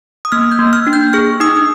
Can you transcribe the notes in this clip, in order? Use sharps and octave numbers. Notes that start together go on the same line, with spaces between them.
D#6
A#3 F6
G6
A#3
F6
D4
G6
G#4 F6
D#4 D#6